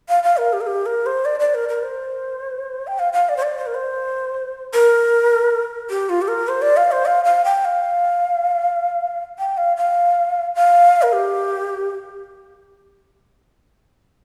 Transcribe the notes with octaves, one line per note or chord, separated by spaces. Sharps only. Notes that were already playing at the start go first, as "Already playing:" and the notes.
F5
F5
A#4
G4
A#4
G4
A#4
C5
D5
D5
A#4
A#4
C5
G5
F5
F5
D5
C5
D5
C5
A#4
C5
A#4
G4
F4
G4
A#4
C5
D5
F5
C5
F5
F5
G5
F5
G5
F5
F5
F5
A#4
G4